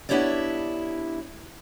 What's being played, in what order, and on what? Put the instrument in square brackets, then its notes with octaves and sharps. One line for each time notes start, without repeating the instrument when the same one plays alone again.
[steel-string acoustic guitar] B3 D4 E4 G4 C#5 D5